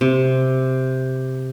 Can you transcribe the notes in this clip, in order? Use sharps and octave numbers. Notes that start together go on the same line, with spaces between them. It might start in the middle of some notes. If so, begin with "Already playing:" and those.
C3